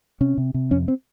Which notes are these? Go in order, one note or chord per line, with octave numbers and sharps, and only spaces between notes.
C3 C#4
C3
C3
F2 C#4
C4